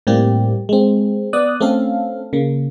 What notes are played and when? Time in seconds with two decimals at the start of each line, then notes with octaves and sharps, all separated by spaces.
0.07 A2 G3 A#3 C4 G4
0.69 G#3 C4
1.33 B3 D5 D#6 F#6
1.61 A3 C4 C#4 A4 F5
2.33 C#3 A#3